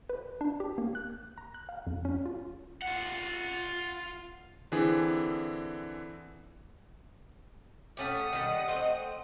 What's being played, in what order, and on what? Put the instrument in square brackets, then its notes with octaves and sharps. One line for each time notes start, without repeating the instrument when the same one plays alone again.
[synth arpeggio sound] B4
D4
G4
A#3
F#6
A#5
F#6
F5
F2
C#4
F4
[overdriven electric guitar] F4 F#5
[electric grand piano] D3 E3 C4 E4 G#4
[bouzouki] A3 C#4 G4 [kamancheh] F#5 D#6
[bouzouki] D#3 G3
A3 C4 D#5